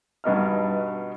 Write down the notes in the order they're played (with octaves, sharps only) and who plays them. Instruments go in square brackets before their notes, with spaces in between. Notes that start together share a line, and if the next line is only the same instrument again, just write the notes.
[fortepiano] G2 B2 D#4 F6